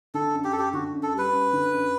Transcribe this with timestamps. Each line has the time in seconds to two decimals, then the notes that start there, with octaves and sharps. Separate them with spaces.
0.14 D3 A4
0.34 F#2
0.44 G4
0.52 F#2 A4
0.59 G4
0.73 D3 F#4
0.93 F#2
1.03 A4
1.14 G3 B4
1.33 F#2
1.53 D3
1.72 F#2